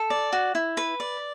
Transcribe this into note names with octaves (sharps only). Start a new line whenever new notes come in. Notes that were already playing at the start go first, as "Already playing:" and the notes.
Already playing: A4
D5
F#4
E4
B4
D5